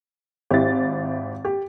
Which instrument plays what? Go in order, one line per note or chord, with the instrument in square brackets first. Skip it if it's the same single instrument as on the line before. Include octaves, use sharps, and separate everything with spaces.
[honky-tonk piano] G#1 E4 A6 [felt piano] G4
[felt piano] G4